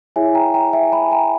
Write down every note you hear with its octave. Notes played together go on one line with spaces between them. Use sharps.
E4 G#4 C#5 E5 G#5
G5 A#5
G5 A#5
E5 G#5
G#5 B5
G5 A#5